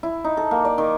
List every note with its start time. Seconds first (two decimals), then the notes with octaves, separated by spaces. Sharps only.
0.03 E4
0.24 D#4
0.37 A4
0.51 A#3
0.65 D5
0.78 D#3